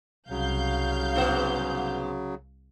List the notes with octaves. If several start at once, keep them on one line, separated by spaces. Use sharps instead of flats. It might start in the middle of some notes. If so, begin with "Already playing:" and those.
C2 C#3 F#3 F5 G6
G#2 B3 C5